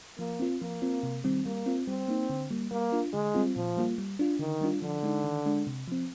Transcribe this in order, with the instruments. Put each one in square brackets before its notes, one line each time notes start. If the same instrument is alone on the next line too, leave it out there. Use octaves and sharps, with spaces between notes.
[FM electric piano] F3 [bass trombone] A#3
[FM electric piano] C4 F4
[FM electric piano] F3 [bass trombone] A#3
[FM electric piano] C4 F4
C3
D#3 G3 C4
[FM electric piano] G3 [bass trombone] A#3
[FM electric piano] C4 F4
[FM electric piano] G3 [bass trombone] C4
[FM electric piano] A#3 D#4
D3
G3 A#3
[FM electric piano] G3 [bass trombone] A#3
[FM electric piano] D4 F4
[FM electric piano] D3 [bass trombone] G#3
[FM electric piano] G3 C4 F4
[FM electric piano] A#2 [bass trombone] F3
[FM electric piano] G3 A#3 F4
G3
D4 F4
[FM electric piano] D3 [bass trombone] D#3
[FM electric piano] G3 D4 F4
[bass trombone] D3 [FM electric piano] F3
[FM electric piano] G#3 D#4
D#3
G#3 D4
C3
F3 C4